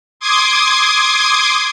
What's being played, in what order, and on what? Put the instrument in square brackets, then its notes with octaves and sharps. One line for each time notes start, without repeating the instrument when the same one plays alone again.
[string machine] C6 D6 D#6 G#6